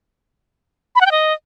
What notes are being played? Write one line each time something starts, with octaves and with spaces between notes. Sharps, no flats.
B5
F#5
G5
D#5